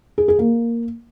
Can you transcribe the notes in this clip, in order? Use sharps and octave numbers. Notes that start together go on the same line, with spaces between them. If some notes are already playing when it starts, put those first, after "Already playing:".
G#4
G#4
A#3